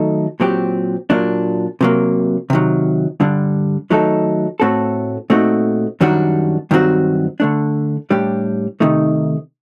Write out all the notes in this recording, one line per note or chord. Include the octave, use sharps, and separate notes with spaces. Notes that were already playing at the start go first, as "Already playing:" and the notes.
Already playing: D#3 F#3 A3 D#4 A4
A#2 F#3 C4 G4
A#2 F#3 A#3 D4
C3 F#3 A#3
C3 D#3 F#3
G2 D3 G3 D4
D#3 F#3 A3 D#4 A4
A2 A3 C4 F#4 A4
A#2 A3 C4 D#4 F#4
F#2 D#3 G3 D4 F#4
G2 D#3 F#3 C4 F#4
D3 A3 D4
A2 G3 D4 G4
C3 D#3 A3 D#4